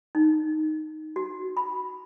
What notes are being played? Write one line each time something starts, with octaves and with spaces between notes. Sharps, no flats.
D#4
F#4
B5